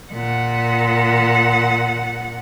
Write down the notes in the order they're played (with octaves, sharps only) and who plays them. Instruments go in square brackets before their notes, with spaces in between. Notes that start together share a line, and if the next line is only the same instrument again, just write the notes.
[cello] A#2 F#5